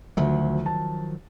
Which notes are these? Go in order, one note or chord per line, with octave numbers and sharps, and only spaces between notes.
D2 D#3 F3 F#3
A5